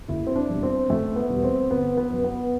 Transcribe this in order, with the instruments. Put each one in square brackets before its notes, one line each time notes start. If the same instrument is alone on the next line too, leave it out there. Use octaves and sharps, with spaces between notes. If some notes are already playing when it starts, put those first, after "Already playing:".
[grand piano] F#1 E4
C4
D4
E2 B2 G3
C4
F#1 A3
B3
E2 B2 G3
C4
G1 B3
B3
F#2 F#3
B3